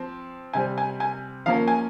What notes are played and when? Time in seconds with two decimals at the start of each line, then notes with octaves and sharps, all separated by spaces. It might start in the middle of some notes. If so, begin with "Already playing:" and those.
Already playing: F3 C4
0.53 C3 G3 C4 G#5
0.78 G#5
1.00 G#5
1.46 F3 A#3 C#4 F5
1.68 G#5